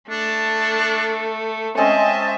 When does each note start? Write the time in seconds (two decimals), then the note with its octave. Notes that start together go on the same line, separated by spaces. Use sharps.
0.10 A3 D4
1.77 G#3 C4 C#4 D#5 E5 A5